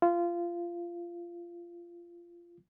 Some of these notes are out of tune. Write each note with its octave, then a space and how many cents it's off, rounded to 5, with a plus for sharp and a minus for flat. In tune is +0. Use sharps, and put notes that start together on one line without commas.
F4 -20